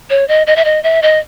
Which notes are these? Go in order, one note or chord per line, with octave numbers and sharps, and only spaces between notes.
C#5
D#5
D#5
E5
D#5
E5
D#5